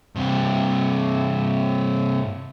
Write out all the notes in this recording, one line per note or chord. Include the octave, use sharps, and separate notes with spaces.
G2 C3